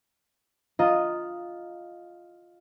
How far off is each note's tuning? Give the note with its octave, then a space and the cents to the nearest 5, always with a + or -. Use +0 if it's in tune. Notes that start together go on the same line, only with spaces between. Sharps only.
F4 +0 D#5 +0 A#5 -5